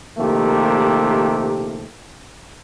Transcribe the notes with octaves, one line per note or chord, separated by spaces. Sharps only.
A#1 C3 D#3 A3 A#3 G4